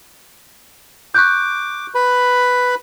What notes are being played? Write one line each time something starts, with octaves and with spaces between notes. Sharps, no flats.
C#6 D6 F#6 G6
B4 B5